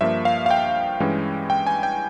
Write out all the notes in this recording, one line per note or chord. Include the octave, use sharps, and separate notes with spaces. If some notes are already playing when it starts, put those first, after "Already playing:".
G2 F3 A#3 E5
F5
F5
G5
G2 E3 G#3 C#4
G5
G#5
G5